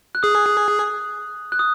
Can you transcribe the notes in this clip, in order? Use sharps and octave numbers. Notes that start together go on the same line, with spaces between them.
F#6
G#4 D#6
F#6
D#6